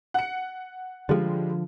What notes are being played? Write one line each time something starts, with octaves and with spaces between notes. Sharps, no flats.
F#5 C#7
D3 F3 G3 G#3